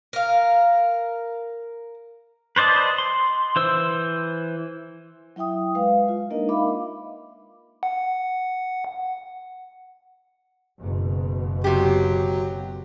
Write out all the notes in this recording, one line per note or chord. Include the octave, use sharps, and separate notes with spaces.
A#4 F5
B4 C5 D5 D#5 A5
C6
E3 C5 E6
F#3 E4 E5 G5 D#6
G#3 B4 F5
F4
G#3 A#3 D4 D#4 A#4 D#5
E5 F5 B5 D6
F#5
F#1 B2
C3 F#3 G4